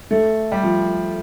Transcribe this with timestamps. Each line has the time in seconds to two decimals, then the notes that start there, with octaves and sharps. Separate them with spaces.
0.11 A3
0.52 G3
0.63 F3